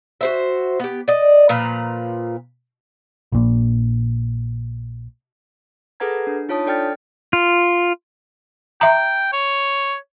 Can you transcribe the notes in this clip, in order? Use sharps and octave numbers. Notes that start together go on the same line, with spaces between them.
F#4 C5 E5
B3 G4
D5 D#5
A#2 F3 B4 A#5
A#1 A#2
G#4 A4 B4 F#5 A#5 G#6
D4
D#4 F4 C#5 A5 D#6
D4 A4 D5 G5 F6 A6
F4
E5 G5 A#5
C#5